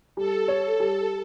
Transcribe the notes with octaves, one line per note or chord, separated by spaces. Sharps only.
G3 A4
C#5
A4
G3